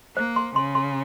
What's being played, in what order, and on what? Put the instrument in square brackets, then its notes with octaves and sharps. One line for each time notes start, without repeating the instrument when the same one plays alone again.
[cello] A#3 [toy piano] C5
[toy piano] C6
[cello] C#3 [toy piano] C6
[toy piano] C6